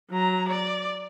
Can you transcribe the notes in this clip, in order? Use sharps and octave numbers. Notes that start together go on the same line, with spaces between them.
F#3 A#5
D5